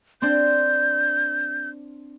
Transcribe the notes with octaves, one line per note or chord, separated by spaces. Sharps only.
C4 D4 C5 G6